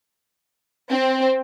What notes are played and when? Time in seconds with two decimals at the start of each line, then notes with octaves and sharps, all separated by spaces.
0.90 C4